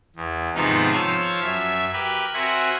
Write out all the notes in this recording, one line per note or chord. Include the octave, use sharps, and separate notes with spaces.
E2
G#2 C3 D#3 F3 B3 D#4
F3 F4 C#5 E6 G#6
F#2 E5 G#6
G4 A#4 B4
C4 F#4 A#4 E5 F#5 G#5